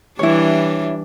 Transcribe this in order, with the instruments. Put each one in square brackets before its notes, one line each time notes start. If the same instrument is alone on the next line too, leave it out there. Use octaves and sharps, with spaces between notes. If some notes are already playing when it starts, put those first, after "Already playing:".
[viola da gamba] E3 G3 D4 [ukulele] E4 C#5